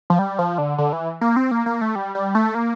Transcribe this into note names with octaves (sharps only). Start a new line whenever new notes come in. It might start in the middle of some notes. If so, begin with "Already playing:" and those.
F3
G3
F3
D3
D3
E3
A#3
C4
A#3
A#3
A3
G3
G3
A3
A#3